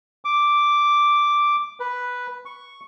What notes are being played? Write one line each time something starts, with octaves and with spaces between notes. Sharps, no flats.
D6
B4
C#6